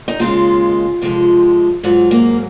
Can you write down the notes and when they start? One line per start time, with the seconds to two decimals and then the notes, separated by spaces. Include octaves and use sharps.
0.08 D#4
0.19 D#2 C#3 G#3 F4
1.02 F2 C3 F3 G#3
1.83 G#2 F#3 F4
2.11 A#3